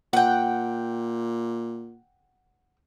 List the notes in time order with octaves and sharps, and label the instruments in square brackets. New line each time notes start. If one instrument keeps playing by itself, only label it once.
[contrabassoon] A#2 [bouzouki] F#5 G5